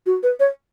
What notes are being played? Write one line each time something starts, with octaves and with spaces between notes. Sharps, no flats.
F#4
B4
C#5